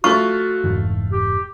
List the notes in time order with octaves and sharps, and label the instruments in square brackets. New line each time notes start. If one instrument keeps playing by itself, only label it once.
[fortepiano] A3 F4 [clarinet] F#4 [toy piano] C#6
[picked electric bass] F1 G#2 E3
[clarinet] G4